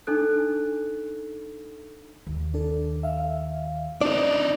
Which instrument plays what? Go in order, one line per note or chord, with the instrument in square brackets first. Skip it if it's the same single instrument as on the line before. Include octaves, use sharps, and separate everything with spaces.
[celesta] D4 D#4 A4 F#6
[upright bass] D#2
[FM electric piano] D4 A4
E5 F5
[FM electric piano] C4 [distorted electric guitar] D4 D#4 [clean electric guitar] D5